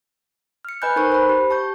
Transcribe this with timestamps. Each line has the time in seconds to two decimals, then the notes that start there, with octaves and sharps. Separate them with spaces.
0.65 F6 C#7
0.82 B4 D#5 G#5 B5 F#6 G6
0.96 D#4 A#4 C5 C#6 F#6
1.12 C5 B5
1.29 G4
1.50 G4 A5 C#6 G6